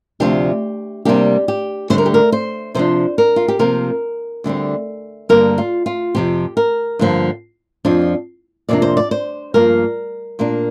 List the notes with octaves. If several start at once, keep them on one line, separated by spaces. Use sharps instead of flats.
D2 C3 F3 D4 G4
C3 G3 A#3 D4 G4
G4
D2 D3 G3 C5
A#4
G4
A#4
C5
C3 F3 D4 C5
A#4
F4
G4
C3 F3 A#3 A#4
D2 D3 G3 C4
G2 D3 G3 A#3 A#4
F4
F4
F2 C3 F3 G4
A#4
G2 D3 F3 A#3
F2 F3 D4
F2 C3 A#3 D4 D5
C5
D5
C5
G2 F3 A#3 A#4
A#2 A#3 D4